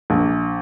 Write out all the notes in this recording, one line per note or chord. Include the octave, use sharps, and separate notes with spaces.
A#1